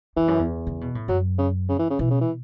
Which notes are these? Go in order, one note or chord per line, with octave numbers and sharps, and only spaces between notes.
E2 E3
F#2
E2
C#3
B2
A2
F#2 F#3
C#3
C#3
E3
C#3
B2 E3
C#3
E3